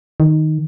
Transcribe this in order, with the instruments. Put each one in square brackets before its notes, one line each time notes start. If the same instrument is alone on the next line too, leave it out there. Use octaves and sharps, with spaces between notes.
[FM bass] D#3